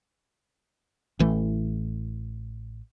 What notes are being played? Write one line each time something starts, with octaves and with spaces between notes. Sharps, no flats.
A1 E3 A3